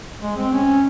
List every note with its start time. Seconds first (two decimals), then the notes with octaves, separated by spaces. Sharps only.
0.21 G#3
0.36 C4
0.53 C#4